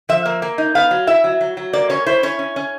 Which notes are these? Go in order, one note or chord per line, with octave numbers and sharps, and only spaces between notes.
F3 E5
A#3
A#3
D#4
B3 F5
F#3
E4 E5
F#3
F#3
F#3
A#3 D5
C#4 C#5
E4 C5
C#4 C#5
C#4
C#4